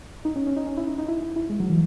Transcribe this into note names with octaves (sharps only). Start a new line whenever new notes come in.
D#4
C#4
C#4
D#4
C#4
E4
D#4
D#4
E4
E4
E4
G#3
F#3
E3